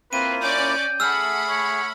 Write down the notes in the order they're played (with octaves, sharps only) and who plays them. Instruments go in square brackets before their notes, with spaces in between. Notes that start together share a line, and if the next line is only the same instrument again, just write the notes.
[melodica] A#3 E4 F4 [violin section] C4 [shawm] B4 [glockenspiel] D#7
[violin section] C#4 D5 D6 [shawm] G5
[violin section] A3 F#5 B5 [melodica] G#4 [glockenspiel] E6 F6
[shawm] C#5